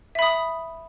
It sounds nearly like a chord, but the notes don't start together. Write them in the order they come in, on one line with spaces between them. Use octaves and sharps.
E5 B5 D#6